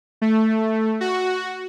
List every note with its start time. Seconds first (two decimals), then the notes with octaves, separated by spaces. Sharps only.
0.22 A3
1.01 F#4